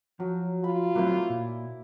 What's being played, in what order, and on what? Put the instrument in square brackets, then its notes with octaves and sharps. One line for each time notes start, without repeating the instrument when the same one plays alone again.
[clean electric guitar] F3 [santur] F#3
[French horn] F4 [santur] B5
[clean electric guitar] F#3 A3 C4 [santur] A#3 E4
[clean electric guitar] A#2